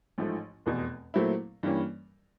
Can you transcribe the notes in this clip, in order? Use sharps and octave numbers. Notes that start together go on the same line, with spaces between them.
A1 G#2 F3 A3
F1 E2 B2
A#2 F#3 A3 C4 E4
G2 E3 G3 A#3 C#4